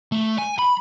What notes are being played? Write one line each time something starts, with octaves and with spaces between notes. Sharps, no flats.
A3
G#5
B5